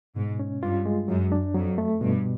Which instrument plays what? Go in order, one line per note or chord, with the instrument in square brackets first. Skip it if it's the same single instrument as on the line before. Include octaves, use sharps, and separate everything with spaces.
[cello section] G#2 [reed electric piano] B2
[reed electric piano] C#4
[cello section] G2 [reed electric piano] F4
[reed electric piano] G#3
[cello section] F#2 [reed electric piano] F#3
[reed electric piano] D4
[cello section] F2 [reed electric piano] F#3
[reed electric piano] A3
[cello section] G2 [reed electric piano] B2